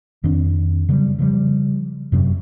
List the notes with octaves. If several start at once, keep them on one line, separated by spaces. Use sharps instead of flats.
F2 D#3 C4 D4
C#3 F#3 G3
C#3 F3 G3
F#2 C3 F#3